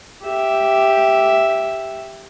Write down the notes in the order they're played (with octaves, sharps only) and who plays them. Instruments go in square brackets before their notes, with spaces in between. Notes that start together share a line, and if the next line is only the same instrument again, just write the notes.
[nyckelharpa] G4 E5